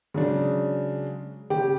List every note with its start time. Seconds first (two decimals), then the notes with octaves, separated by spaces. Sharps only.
0.14 C#3 F#3 G#3 D4
1.50 C#3 G4